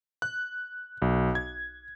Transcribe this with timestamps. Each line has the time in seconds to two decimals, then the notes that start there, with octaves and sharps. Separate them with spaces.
0.22 F#6
1.02 B1
1.35 G#6